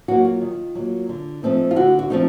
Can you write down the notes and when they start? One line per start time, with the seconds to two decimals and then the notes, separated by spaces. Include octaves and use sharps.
0.08 F#3 A#3 F#4
0.25 F4
0.42 D#3
0.75 F#3 A#3
1.09 D3
1.43 F3 A3 C4 D#4
1.71 F4
1.76 D3 F#4
1.99 F#4
2.10 F3 A3 C4 D#4